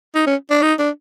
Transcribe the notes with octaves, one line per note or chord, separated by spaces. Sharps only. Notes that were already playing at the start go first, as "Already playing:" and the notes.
D#4
C#4
D4
D#4
D4